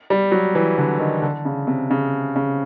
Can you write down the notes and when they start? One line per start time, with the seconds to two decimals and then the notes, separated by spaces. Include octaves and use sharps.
0.10 G3
0.32 F#3
0.55 E3
0.78 D3
0.99 D#3
1.22 D3
1.45 C#3
1.67 C3
1.91 C#3
2.36 C#3